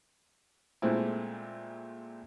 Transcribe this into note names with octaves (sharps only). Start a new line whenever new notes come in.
A#2 G#3 A3 C4 E4